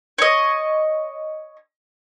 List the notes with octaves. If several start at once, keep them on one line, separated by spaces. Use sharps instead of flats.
C#5 D#5